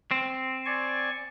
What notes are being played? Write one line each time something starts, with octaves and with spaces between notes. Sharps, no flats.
C4
D5 G#5 C#6